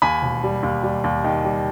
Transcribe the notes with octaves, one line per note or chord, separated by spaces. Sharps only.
D#2 G#5 B5
E1
G3
D#2
G3
D#2
D#3
G3